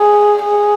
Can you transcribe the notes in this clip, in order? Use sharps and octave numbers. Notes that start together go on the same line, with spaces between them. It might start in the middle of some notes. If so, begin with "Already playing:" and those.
Already playing: G#4
G#4